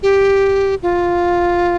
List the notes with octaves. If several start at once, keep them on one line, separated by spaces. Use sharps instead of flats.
G4
F4